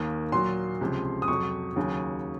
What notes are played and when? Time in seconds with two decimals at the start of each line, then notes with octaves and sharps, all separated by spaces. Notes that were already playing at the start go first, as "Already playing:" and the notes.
Already playing: D#2 D#3 A#3 D#6
0.32 A#2 F#3 A#3 C6
0.81 C#2 C3 F3
1.22 D#6
1.28 F2 C3 F#3 C#6
1.76 D#2 C#3 F#3